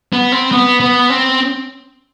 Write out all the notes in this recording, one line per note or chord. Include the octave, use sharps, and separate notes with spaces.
B3
C4
B3
B3
C4